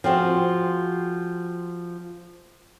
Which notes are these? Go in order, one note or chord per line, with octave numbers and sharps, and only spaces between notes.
F3 C4 F#4 G#4